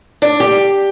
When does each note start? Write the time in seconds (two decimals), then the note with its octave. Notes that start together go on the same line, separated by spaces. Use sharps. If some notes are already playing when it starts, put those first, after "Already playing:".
0.22 D4
0.40 G4